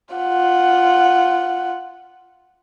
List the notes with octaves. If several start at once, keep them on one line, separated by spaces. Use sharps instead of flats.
F4 F#5